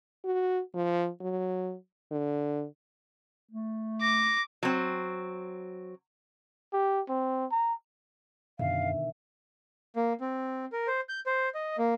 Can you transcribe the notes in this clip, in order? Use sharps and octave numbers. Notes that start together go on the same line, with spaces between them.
F#4
F3
F#3
D3
A3
D6 A#6
F#3 C4
G4
C4
A#5
F#2 B2 D3 D#3 E5 F5
A#3
C4
A#4
C5
G6
C5
D#5
A#3